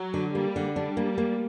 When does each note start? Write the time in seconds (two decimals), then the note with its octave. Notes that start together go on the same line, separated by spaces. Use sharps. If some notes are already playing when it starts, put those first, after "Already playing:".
Already playing: F#3
0.14 D3
0.35 G3 A#3
0.56 D3
0.76 G3 D4
0.97 A#3
1.18 A#3